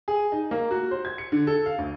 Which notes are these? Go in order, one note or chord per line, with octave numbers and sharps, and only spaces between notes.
G#4
D#4
A#3
F#4
C5
G#6
C#7
D3
A4
F5
D2